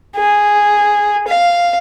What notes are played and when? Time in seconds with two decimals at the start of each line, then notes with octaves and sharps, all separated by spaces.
0.16 G#4
1.28 F5